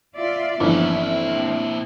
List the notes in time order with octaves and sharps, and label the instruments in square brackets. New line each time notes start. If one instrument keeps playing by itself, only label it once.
[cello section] F4 D5 E5
[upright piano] G1 E3 F3 [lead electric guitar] A#2 E4 [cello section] B3 C#4
[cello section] C4